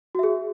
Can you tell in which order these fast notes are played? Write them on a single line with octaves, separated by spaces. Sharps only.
F#4 E5 G#4